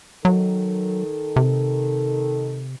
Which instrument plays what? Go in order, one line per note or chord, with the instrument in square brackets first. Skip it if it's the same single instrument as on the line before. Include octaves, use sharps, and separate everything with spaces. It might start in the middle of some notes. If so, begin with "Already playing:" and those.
[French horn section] D#3 A4 [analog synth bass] F#3
[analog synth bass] C3